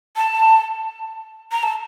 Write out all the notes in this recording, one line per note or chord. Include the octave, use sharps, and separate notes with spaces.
A5
A#5
A5